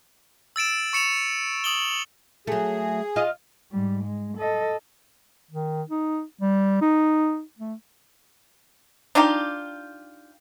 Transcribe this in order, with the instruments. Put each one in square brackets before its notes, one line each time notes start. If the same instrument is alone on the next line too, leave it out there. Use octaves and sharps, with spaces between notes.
[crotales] E6 A6 D7 E7
C#6 C#7 E7 F7
D#6 F#7 G7
[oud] F#3 A3 [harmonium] G#4
[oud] F4 D#5 F5
[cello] G#2 G3
G#3
A4 D#5
[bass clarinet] D#3
D#4
G3
D#4
A3
[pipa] D4 D#4 F4 G4